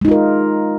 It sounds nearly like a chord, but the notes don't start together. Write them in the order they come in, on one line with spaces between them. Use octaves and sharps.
G#3 D#4 F4 A#4